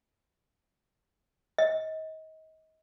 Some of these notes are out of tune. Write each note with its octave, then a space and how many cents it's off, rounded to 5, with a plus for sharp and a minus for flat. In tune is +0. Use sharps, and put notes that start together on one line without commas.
D#5 +30